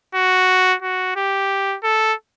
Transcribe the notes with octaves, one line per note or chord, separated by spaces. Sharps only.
F#4
F#4
G4
A4